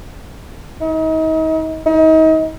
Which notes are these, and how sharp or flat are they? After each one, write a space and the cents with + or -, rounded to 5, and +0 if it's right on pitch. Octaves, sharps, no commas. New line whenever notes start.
D#4 +35
D#4 +35